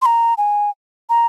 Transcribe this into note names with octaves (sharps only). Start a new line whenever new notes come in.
C6
A#5
G#5
A#5